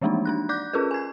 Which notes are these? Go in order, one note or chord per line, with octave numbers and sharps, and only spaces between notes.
E3 F3 G#3 A#3 D4 D#4
D4 D#4 F#6
D5 D6 F#6 G6
C#4 F4 G#4 A#4 B4
G#5 G#6